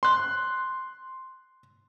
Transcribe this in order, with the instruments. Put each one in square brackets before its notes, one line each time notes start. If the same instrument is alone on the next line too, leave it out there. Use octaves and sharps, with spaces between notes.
[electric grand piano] C6 F#6